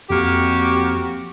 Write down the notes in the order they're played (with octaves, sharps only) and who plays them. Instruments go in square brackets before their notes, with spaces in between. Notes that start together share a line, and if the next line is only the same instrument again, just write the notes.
[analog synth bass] F2 [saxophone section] A#3 F#4 G4